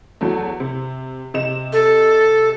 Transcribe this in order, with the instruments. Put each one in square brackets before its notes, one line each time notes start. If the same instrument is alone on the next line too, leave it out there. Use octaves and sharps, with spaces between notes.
[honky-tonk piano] E2 F#3 A3
C3
C3 D#5 E7
[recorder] A4